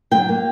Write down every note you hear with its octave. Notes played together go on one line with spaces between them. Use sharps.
F#3 G5
A#3